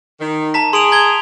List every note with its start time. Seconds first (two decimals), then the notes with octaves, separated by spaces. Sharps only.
0.20 D#3
0.54 A5 A#5 B6
0.73 G#4 C6 D7 F7
0.92 A#5 G#6 G7